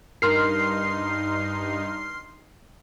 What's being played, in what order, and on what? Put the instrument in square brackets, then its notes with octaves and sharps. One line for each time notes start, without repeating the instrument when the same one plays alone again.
[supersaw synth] G2 D#4 [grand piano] A#4 [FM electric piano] C6 F6 C7